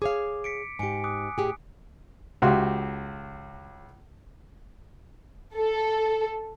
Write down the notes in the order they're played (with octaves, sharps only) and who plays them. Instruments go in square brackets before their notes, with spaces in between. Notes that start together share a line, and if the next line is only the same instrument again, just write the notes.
[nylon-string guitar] G#4 C#5 F5 [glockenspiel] D6
[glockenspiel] B6 C#7 D7
[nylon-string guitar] G#2 G4 [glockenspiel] G#5 C#7 D7
[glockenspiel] D6 D#6 F#6
[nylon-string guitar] A2 G4 G#4
[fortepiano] C#2 F#4 G4 E5 C6
[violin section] A4